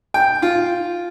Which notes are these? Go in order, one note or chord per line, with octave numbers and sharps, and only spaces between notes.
G5
F4